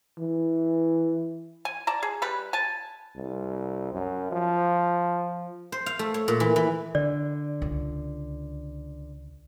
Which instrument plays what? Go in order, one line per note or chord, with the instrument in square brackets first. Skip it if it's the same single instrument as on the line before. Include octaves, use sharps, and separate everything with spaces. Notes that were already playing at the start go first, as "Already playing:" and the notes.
[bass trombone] E3
[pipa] G#5
D5 A5 A#5
G#4
G3 B4
G#5 A5
[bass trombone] C2
F#2
F3
[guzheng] C5
F5
A3
C#5
A#2
E3
E3
[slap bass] D3 [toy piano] D5
[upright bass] C#2